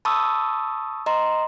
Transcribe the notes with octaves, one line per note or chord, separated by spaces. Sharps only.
A5 B5 C#6 D#6 E6
D#5 A#5 C6